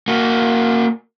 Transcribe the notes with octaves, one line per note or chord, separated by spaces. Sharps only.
A#3 F#4